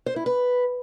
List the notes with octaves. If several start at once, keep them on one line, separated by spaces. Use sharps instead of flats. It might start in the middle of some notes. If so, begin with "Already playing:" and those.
C5
E4
B4